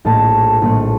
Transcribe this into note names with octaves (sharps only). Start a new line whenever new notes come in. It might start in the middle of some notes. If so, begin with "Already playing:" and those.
A#1 A2 A3 A5
A#1 A2 A3